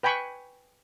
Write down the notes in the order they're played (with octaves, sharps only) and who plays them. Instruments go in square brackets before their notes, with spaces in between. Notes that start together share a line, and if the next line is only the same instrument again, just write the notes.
[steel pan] B4 G5 G#5 B5 C#6